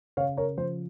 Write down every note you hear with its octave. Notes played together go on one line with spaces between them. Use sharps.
C#3 C#5 F5
A#4 C#5
F3 C5